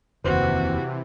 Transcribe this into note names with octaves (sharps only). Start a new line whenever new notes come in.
F1 D#2 C3 E3 F#4 B4 C5